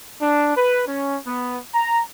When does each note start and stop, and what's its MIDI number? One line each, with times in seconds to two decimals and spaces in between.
0.20 0.53 62
0.57 0.82 71
0.86 1.16 61
1.25 1.58 59
1.73 2.02 82